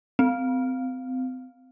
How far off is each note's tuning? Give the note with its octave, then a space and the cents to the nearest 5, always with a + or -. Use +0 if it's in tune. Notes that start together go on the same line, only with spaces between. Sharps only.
C4 -30